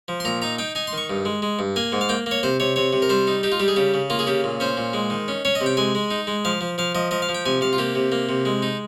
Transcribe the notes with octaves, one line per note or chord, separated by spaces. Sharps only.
F3
C6
A#2 A#5
D#4 A#5
D#4 G5
D#4 G#5
C6
D#3 C#6
G2
G#3
G#3
G2
A#3 G#5
G#2
F5
A#3 G5
A#3 C#5
C3 C5
C3 C#5
C3 C#5
C3
A#4
G3 C5
D#4
D#4 G4
F4
G3 G4
G#4
C#3 G4
C#3
A#3 F4
G#4
C#3 G4
A#2
C#4 C5
A#2
G#3
D#3
C#4
C#4 C#5
D#5
C3
G5
G#3 G#5
G#3
D#4
G#3
F3 F5
F3
F3 F5
F3 D#5
F3 D#5
F5
F3
G5
C3 G#5
C3 F5
F4
A#3 G4
C3
A#3
C3
G#3
D#4